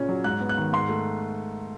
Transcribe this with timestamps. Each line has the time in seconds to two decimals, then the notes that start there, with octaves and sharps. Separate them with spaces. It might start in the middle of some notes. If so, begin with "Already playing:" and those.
Already playing: A#2 C#3 C#4
0.09 F#3
0.24 G#2 F#6
0.41 B3
0.49 F#6
0.58 D#3
0.73 G#2 C6
0.89 A3